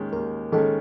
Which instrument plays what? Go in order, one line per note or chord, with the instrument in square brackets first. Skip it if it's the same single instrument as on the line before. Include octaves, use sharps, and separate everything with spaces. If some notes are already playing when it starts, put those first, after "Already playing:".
Already playing: [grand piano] D#2 D#3 G#3 C#4
[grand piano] D#2 [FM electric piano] A#4
[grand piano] D#3 G#3 C#4 [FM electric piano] A4